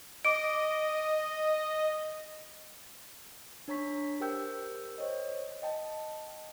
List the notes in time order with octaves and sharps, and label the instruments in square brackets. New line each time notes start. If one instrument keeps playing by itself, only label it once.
[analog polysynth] D#5 [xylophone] D6 D7
[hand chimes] D4 C#5 A#5 C#6 B6
G4 A#4 C5 G5 E6 G6
C5 C#5 D#5
D#5 G5 A5